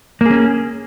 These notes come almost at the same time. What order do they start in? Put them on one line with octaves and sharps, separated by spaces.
A#3 G#4 C#4